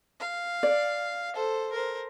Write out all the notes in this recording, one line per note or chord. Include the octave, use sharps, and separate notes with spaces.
F5
D5
A4 C5
A#4 C5